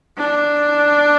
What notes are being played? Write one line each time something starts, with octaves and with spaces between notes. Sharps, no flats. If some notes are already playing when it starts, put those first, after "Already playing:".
D4